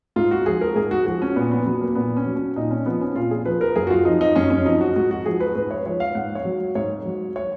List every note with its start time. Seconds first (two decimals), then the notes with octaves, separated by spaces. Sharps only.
0.16 G#2 F4
0.31 F#4
0.46 F3 G#4
0.61 A#4
0.76 G#2 G#4
0.91 F#4
1.06 F3 F#4
1.22 C#4
1.36 A#2 B3
1.51 B3
1.66 F#3 B3
1.81 A#3
1.95 A#2 B3
2.17 C#4
2.26 F#3
2.36 C#4
2.56 A#2 D#4
2.71 C#4
2.86 F3 B3
3.01 C#4
3.15 A#2 F4
3.31 G#4
3.45 F3 B4
3.61 A#4
3.76 F#2 G#4
3.87 F#4
3.90 F4
4.05 F3 D#4
4.21 D#4
4.36 F#2 C#4
4.50 C#4
4.65 F3 D#4
4.81 F#4
4.96 G#2 F#4
5.11 F#4
5.26 F3 G#4
5.40 B4
5.56 G#2 B4
5.71 C#5
5.86 F3 C#5
6.00 F5
6.15 G#2 F#5
6.35 C#5
6.45 F#3
6.75 G#2 C#5
7.05 F#3
7.36 C#5